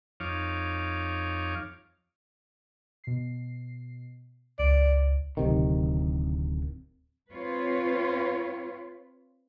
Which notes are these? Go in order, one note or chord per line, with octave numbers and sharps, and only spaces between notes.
F2 D#4 C#5 F5 D6
B2 C7
C#2 D5
D1 C3 D#3
C4 F4 B4 C#5